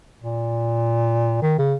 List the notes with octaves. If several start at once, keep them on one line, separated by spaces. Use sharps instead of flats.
A#2
D#3
C#3